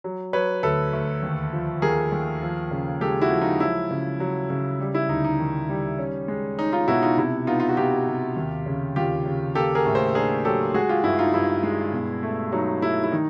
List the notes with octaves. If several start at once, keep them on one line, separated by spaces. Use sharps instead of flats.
F#3
F#3 B4 C#5
D2 A4 B4
D2
D#2
F3
D#2 G#4 A#4
D#2
F3
C#3
G#3 G4 A4
E4 F#4
F3
D#4 F4
F#3 E4
C#3
F#3
C#3
G3
E4
D2 D#4
D#4
D#3
G3
C#4
G#3
C#4 D#4
D#4 F4
B2 E4 F#4
D#4 F4
C3 E4
B3 D#4 F4
F4
F#4
C3 F4 G4
C3
D#2
C#3
D#2 F4 G4
C#3
A#3 G4 A4
G#4 A#4
A2
A#4 C5
D4 G#4 A#4
F#3 G4 A4
G#3 F#4 G#4
F4 G4
G2 E4
D#4 F4
G2 E4
G#3
B2
A3
F#3 D#4
A3 E4
E4
D#3 D#4